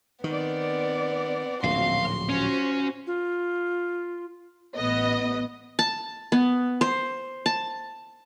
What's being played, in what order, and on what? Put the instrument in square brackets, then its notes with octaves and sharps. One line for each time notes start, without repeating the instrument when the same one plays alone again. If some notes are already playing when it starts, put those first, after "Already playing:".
[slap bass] D#3 [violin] B3 [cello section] C4 D5
[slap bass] D1 A#1 [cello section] C4 C#4 F#4 [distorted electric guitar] F5 [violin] C6
[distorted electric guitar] C#4 [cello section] F4 F#4 C5
[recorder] F4
[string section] A1 B3 D#5
[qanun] A5
B3
C5
A5